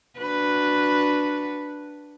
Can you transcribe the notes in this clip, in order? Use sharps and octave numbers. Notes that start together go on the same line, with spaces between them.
D4 F#4 B4